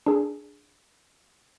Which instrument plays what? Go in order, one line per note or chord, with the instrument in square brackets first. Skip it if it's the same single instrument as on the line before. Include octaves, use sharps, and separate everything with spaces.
[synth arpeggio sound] D4 G#4